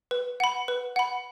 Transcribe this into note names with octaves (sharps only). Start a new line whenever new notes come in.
B4
F#5 B5
B4
F#5 B5